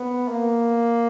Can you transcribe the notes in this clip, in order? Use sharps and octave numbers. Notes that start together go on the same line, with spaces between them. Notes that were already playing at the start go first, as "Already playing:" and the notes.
Already playing: B3
A#3